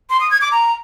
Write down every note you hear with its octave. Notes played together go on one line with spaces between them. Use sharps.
C6
D#6
G#6
D6
A#5